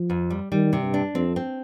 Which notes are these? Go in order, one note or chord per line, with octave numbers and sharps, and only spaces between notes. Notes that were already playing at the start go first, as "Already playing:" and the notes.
Already playing: F3
F2
G3
D#3 G3
C3
G2
D4
F2 C4
C4